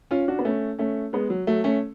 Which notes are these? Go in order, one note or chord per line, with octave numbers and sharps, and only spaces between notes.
C#4 F4
D4 F#4
B3
A3 C#4
A3 C#4
G#3 B3
F#3
F#3 A3
A3 C#4